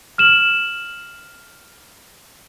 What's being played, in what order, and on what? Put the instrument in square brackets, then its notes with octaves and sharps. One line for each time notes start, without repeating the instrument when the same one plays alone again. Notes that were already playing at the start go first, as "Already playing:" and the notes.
[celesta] F6 E7 F#7